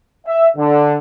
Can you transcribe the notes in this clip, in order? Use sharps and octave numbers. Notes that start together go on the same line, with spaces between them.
E5
D3